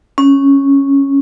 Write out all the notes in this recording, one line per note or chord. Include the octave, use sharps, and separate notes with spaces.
C#4